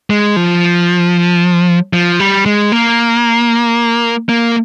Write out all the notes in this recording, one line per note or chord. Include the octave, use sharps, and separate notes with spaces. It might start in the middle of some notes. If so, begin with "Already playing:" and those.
G#3
F3
F3
G3
G#3
A#3
A#3